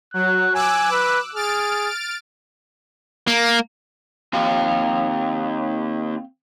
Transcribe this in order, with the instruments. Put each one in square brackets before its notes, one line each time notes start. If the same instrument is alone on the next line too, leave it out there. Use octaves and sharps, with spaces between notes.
[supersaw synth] F#3 [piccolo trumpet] F#6
[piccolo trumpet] G#5 [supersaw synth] D6 E6 F#6
[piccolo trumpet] B4
[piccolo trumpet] G#4 [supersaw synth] F6 A6 D7
[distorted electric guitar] A#3
[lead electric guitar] D#2 [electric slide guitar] C4 F5 G5